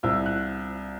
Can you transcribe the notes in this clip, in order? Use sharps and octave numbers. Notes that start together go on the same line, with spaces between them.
C2 E6
F#6